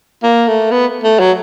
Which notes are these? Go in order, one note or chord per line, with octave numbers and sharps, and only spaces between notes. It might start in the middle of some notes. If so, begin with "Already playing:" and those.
A#3
A3
B3
A3
F#3